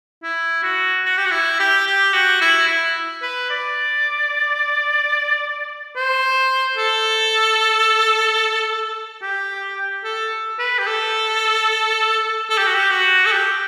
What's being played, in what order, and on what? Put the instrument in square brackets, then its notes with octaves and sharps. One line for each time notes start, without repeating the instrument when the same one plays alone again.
[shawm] E4
F#4
F#4
G4
F#4
E4
G4
G4
F#4
E4
E4
B4
D5
C5
A4
G4
A4
B4
G4
A4
A4
G4
F#4
G4
F#4
A4
G4